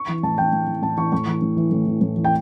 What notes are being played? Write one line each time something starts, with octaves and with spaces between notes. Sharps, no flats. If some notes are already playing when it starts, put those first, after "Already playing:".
Already playing: C#6
E3
A2 A5
E3 G5
A2
E3
A2 A5
E3 C#6
A2 C#6
E3
A2
E3
A2
E3
A2
E3
G5